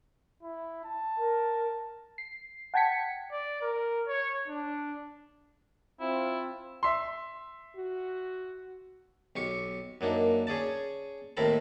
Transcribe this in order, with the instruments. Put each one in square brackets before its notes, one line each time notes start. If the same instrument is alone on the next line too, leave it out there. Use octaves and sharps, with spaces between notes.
[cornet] E4
A5
[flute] A#4
[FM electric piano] C7
F#5 G5 A5 G#6 B6 C#7
[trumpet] D5
A#4
C#5
D4
[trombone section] C4 F4 [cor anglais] E4
[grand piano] E5 C6
[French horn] F#4
[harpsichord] B1 G4 C#6
F#2 A#3 D4 D#4
C#4 G#4 D5 A5
D#2 A2 C4 A#4 A5 B5